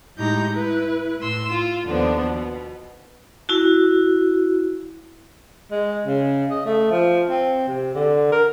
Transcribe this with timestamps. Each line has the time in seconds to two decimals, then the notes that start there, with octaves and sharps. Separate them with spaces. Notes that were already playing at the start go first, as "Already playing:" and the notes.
0.17 A2 G#3 D#4 G4 A#5 G6
0.51 E4 B4
1.20 A2 C6 E6
1.49 F4
1.85 D#2 D3 F3 B3 D4 C5
2.24 B2
3.49 E4 F#4
5.71 G#3
6.07 C#3
6.51 D#5
6.66 A3
6.91 F3
7.30 C4
7.68 C3
7.94 D3
8.32 A#4